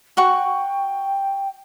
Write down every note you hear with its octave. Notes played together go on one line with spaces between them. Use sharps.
F#4 F#5 G5 C#6